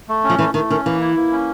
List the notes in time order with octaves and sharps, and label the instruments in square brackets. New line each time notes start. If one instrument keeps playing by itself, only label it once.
[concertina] A3
C#4
[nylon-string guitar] F3
[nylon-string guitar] E3 [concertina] A3
[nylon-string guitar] D#3 [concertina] A3
[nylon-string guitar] D#3 [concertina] C#4
[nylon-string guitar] E3 [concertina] A#3
[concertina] E4
A#3
C#4